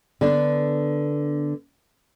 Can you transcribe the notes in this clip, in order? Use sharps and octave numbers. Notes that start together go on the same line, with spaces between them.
D3 B3 D4